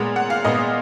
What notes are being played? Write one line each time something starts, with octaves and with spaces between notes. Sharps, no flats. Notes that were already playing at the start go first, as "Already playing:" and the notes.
Already playing: A#2 G#3 B3
F#5
F5
A#2 G#3 B3 D#5